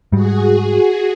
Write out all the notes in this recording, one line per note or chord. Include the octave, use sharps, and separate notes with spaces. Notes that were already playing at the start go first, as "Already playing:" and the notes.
G#2 G3 F#4 G#4